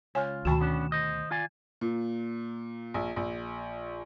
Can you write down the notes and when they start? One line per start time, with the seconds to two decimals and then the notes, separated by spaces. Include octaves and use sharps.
0.15 C#2 F4 C#5 G#5
0.45 D2 B2 D#3 F#4 A5 B5 E7
0.61 B3 C#4 D4
0.92 C5 D#5
1.31 F4 D5 G#5
1.81 A#2
2.94 A#1
3.16 A#1